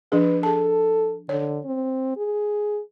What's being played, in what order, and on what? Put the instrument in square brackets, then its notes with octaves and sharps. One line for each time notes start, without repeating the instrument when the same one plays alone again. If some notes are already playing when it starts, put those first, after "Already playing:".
[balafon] F3 D4 G#4 [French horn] B4
[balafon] G#4 A5 [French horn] A4
[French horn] D3 [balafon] C#5
[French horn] C4
G#4